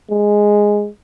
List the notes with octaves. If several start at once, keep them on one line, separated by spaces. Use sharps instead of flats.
G#3